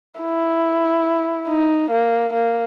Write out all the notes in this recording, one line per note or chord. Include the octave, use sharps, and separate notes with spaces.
E4
D#4
A#3
A#3